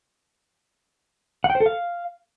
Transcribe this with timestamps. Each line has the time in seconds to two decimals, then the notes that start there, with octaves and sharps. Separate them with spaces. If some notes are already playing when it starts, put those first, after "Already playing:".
1.44 F#5
1.50 G5
1.55 C5
1.60 A4
1.66 F5